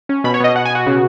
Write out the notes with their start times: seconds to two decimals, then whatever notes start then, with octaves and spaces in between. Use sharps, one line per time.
0.09 C#4
0.24 B2 B5
0.34 C#5
0.40 B2 D#5
0.54 B2 F#5
0.65 G#5
0.71 B2 F#4
0.87 C#3